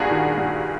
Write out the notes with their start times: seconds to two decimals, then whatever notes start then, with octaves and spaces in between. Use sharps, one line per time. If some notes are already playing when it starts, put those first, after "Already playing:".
Already playing: G2 A#2 F#4 G#4
0.10 D#3
0.37 G2